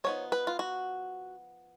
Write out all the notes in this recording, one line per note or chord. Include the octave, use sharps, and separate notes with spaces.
F3 B3 D#4 C#5
B4
F4
F#4